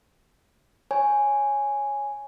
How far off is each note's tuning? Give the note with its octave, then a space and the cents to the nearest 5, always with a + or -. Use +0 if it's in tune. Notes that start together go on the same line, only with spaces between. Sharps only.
C#5 +0 G#5 +0